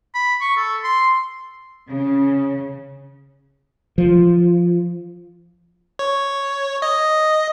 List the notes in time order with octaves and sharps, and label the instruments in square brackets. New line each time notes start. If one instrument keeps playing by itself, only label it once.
[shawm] B5
C#6
A4
C6
[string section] C#3
[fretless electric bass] F3
[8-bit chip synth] C#5
D#5